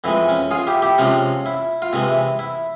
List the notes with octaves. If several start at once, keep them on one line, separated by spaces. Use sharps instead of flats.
F2 E3 G#3 E4
C#4
F4 G#4
E4 G4
E4 G4
C3 F3 G#3 C#4 F4
E4
F4
C3 E3 G#3 E4
E4